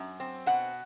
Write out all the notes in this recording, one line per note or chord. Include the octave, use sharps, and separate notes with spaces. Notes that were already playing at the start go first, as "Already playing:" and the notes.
Already playing: F#2
C4
B2 F#5